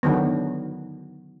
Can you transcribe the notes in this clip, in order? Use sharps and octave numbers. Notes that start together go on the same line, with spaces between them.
D3 D#3 F#3 B3